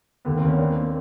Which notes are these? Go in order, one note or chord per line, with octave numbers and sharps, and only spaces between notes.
D#2 A3 B3
A#3 C4
D#2
B3 C#4
A#3 C4 D4
A#3